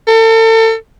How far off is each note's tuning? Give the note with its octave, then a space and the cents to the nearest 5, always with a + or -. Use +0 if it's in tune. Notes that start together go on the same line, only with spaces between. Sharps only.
A4 +35